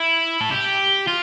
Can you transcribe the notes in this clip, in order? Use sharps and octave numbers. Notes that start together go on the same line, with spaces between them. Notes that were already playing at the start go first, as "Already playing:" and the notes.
Already playing: E4
A4
G4
F4